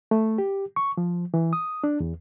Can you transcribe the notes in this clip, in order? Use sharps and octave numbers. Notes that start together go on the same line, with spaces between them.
A3
G4
C#6
F3
E3
D#6
D4
E2